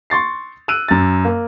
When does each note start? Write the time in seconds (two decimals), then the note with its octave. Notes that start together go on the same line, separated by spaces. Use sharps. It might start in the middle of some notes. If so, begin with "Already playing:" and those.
0.10 C6 C#6 A6 C7
0.68 E6 F#6 D7 D#7
0.88 F#2 A6
1.25 A#3